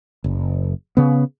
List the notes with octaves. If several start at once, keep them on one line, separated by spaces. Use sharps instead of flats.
F#1
C#3 B3